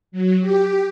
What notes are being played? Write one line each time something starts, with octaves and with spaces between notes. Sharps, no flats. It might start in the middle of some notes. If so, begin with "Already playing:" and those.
F#3
G4